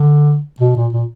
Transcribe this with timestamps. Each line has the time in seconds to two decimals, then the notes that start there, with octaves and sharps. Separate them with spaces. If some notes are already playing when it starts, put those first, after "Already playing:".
Already playing: D3
0.60 B2
0.76 A#2
0.93 A#2